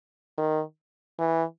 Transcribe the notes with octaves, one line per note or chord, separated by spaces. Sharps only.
D#3
E3